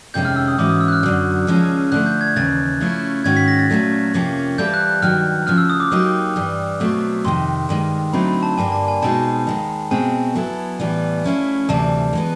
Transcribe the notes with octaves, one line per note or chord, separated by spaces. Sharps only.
F2 C3 D#3 G#3 C#4 G6
F6
E6
D#6
G#2 E3 G#3 C#4 F#4 D6
D#6
E6
F#6
F6
F#2 D3 F#3
D#2 C#3 F3 G#3 C#4
D3 F3 A3 F#6
G6
G#6
D#2 C#3 E3 A6
C#3 F3 A3 C#4 E4
G#2 D#3 G#3 C#4 F#4 G#6
B6
A#6
A6
A#2 F#3 A3 C#4
F2 C3 F3 A#3 C#4
E3 G3 C4 F4 A4 G6
F#6
F#6
G2 D#3 F#3 F6
D2 C#3 F3 F6
E6
D#6
D6
F#3 A#3 D#4 G4 D#6
G2 E3 G3
B2 F#3 A3 C4
F2 C3 D#3 C6
G2 D#3 G#3
D3 F#3 A3 C4 D#4 B5
B5
A5
G2 D3 G3 A#3 G#5
A5
G#5
B2 G#3 C4 D#4 G#4 A5
D#2 D#3 G#3
B2 G#3 C4 G#5
F#3 B3 E4 A4
A2 E3 G3 B3
F3 A3 C#4 E4
D2 C3 E3 G3 C4 A5
E3 G#3 B3